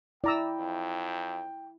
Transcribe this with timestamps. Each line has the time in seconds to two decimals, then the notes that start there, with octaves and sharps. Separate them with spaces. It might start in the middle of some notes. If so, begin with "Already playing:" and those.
0.24 E4 D5 G5 A#5 E6
0.58 F2